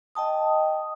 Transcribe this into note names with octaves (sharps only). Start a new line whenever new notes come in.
D#5 G5 A5 D#6